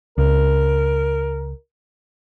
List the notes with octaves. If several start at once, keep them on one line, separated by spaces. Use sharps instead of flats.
C#2 A#4